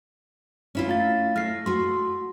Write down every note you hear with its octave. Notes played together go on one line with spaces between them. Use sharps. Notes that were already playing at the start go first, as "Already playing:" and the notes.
C#4 E4 F4
A3 F5 A6
A3 F6 A#6 C7
A3 F#4 C6